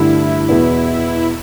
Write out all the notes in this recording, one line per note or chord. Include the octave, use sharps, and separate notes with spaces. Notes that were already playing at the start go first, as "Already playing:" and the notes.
Already playing: G2 D3 A3 D4 E4
E2 B2 B3 E4